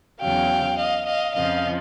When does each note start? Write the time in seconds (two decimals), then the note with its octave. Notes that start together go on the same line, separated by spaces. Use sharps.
0.21 E2 C#3 F#3 F5 G5
0.78 D#5 F5
1.07 D#5 F5
1.35 F2 C#3 F3 D#5 F5